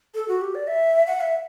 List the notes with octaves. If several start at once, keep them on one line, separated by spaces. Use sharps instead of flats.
A4
F#4
G4
D5
E5
F#5
E5